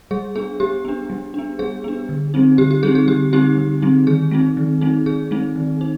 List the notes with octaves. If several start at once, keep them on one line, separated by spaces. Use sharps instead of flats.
G3 G#4
B3 D4 G#4
G3 G4
B3 D4
G3
B3 D4
G3 G#4
B3 D4
D3
G3 C4 D#4
D3 G4
G4
G3 C4 D#4 G#4
G#4
D3 G4
G3 C4 D#4 G4
D3
G3 C4 D#4
D#3 G#4
G#3 C4 D#4
D#3
G#3 C4 D#4
D#3 G#4
G#3 C4 D#4
D#3
D#4